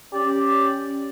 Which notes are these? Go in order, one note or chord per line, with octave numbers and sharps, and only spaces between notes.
C#4 G4 D5